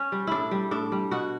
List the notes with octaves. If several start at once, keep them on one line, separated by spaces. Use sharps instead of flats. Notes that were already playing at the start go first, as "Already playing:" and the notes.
Already playing: C#4
G3
A2 D4 E4
G3
A2 D4
G3
B2 F#4